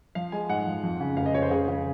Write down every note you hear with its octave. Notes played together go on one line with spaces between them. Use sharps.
F3 F5
G#3 G#5
G#2 F#5
F3
F2
C#3
F1 F5
D#5
F1 C#5
C5
C#3 G#4
C#3